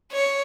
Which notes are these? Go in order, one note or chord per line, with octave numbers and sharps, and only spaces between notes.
C#5